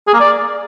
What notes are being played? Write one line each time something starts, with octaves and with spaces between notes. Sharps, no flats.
G#4
A#3
D5